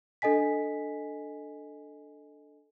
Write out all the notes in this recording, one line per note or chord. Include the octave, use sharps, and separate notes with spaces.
D4 A4 D#5 G#5 B6